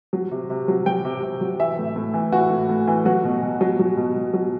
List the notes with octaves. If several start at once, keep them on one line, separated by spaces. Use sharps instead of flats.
F#3
C3
C3
F#3
F#3 G5
C3
C3
F#3
E3 E5
A2
A2
E3
E3 F#4
A2
A2
E3
F#3 F#4
B2
B2
F#3
F#3
B2
B2
F#3